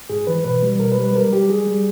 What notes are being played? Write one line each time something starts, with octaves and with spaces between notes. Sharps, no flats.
G#2 G#4
E3 B4
B2 B4
G3
B2 A#4
B4
G3
B4
G3 A#4
G3 G4
G3 G#4
G3